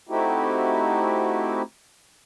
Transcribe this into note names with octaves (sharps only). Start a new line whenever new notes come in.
A3 C4 D#4 E4 F#4 G4